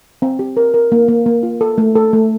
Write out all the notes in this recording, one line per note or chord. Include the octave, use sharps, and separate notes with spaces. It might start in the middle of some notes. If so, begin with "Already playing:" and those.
C4
G4
A#4
A#4
A#3
A#3
A#3
F4
A4
A3
A4
A3